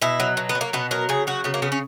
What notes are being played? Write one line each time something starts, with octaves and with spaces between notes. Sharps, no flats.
B2 E4
F#3
B2
B3
F#3
A#3
B2 B3
F#3 A#4
C#3 G#4
F#3 F#4
C#3 B3
A#3
C#3 B3
C#4